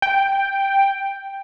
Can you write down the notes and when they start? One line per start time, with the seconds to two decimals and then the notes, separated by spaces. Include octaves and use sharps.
0.02 G5